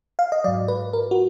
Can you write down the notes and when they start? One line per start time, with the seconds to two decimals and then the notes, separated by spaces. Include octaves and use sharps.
0.19 F5
0.32 D#5
0.44 G#2 F#3 D5
0.68 B4
0.93 A#4
1.11 F#4